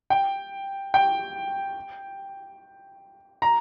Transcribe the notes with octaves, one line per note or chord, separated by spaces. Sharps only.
G5
G5
A#5